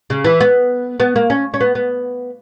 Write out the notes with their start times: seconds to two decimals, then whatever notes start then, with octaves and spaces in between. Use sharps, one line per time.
0.10 C#3
0.24 E3
0.40 B3
1.00 B3
1.16 A#3
1.30 C#4
1.54 C#4
1.60 B3
1.75 B3